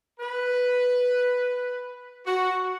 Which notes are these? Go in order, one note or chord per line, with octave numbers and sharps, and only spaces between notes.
B4
F#4